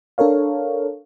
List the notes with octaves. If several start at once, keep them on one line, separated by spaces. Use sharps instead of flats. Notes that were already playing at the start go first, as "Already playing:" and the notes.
D4 A4 A#4 C#5 F5